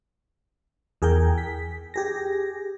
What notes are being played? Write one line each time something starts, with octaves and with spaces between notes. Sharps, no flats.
E2 G#4 A#4 G5
B6
G4 G#4 A#6